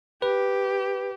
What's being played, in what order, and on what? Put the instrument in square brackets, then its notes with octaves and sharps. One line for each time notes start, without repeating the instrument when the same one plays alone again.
[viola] G4 [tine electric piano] B4